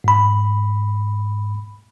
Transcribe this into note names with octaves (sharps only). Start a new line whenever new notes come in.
G#2 B5